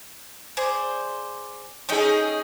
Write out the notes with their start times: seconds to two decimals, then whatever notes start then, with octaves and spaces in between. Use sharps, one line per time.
0.57 G#4 C5 D5
1.89 A3 C#4 D#4 G#4 D#5 G5